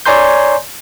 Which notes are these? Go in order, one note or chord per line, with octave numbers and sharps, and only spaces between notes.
C#5 D5 G#5 A#5 C6 G6